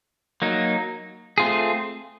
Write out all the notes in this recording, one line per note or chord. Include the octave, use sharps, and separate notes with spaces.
F#3 A#3 D#4
A3 C4 F4 G#4